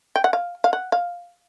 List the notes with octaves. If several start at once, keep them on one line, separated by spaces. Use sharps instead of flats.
G5
F#5
F5
F5
F#5
F5